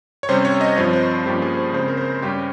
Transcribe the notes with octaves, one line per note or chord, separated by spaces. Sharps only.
C#5
C3 G3 C#4 C5
C#5
D#5
G2 F3 C4 C#5
C5
G2 F3 A#3 C#4 G4
G#4
C5
C#3 G#3 C4 C5
A#4
C5
G2 G3 C#4 G4